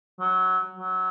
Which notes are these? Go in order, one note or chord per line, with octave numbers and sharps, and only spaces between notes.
F#3
F#3